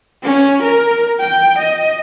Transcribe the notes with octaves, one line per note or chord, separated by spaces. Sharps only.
C#4
A#4
G5
D#5